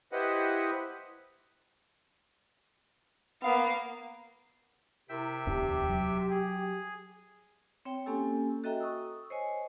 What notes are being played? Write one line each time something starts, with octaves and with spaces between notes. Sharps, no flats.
E4 G4 B4 C5 D#5 F#5
A#3 B3 F5
C3 E4 A#4 E5 G5
D1 E2 D4 G4
F#3
G#4
C4 C#5 G5
A#3 C#4 G4 A4 G#5 E6
F#4 A4 D#5 E5 G5 A#5
C#6 D#6 E6
C5 C#5 D#5 G#5